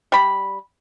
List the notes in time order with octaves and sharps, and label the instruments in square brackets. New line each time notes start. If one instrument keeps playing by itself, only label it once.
[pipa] G3 B5